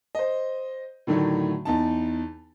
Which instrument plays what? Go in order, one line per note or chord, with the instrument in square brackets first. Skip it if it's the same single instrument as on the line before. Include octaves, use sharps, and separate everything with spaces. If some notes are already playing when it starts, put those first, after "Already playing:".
[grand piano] C5 D#5
A2 D3 D#3 F#3 A3
E2 D#4 A5